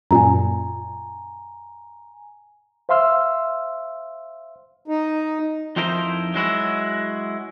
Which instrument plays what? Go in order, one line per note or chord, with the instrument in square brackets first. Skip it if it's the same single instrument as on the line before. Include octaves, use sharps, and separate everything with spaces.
[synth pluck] F#2 A#2 [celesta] G#5 A#5
[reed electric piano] C5 E5 F5 C6 E6 F6
[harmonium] D#4
[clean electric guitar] F2 F3 D#4 E4 A#4 C5
F#3 G#3 E4 F#4